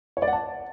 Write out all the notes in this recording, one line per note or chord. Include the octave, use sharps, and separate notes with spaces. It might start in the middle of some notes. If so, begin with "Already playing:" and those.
C#5
D5
F#5
A5